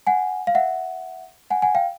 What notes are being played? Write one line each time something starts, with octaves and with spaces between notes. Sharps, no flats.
F#5 G#5
F5
E5 F#5
F#5 G#5
F#5 G#5
F5 G5